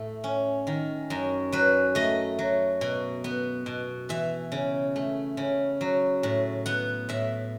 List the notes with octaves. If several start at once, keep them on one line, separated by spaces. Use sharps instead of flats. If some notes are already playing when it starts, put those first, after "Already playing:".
Already playing: A2 A3
C#4
D#3
F#2
F#3 B4
A3 D#5
F#3
B2
B3
B2
E3 E5
C#3
A3
C#3
F#3
A2
B3 F#5
A2 E5